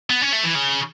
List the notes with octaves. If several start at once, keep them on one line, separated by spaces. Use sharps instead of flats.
B3
C#4
A3
E3
C#3